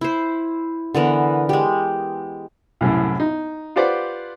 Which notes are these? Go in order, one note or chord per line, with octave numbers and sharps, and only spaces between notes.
E4 C5
D3 E3 B3 A#4
G#3 G4
C2 F#2 A2
D#4
F4 G4 B4 C5 D5 F#5